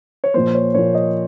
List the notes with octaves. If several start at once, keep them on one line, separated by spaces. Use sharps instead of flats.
C#5
A#2 F3 A#3 C5
C#5
A#2 F3 A#3 C#5
D#5